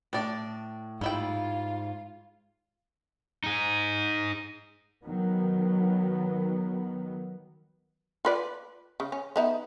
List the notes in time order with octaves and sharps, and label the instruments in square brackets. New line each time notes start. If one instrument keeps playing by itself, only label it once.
[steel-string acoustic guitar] A2 [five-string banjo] D4 D5
[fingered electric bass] G#2 [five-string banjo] G3 E4 G5 [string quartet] F4
[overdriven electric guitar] D#4 G#4
[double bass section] D#3 F#3 B3
[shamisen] F4 B4 D5
C#3
C#4
B3 D#4 E4